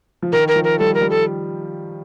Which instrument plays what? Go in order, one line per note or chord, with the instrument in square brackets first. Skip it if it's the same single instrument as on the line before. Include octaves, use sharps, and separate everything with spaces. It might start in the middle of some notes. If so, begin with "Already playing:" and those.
[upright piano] F3
[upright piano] D#3 [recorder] A#4
[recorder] A#4
[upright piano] F3
[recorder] A#4
[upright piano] G3 [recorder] A4
[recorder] A#4
[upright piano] G3
[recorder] A4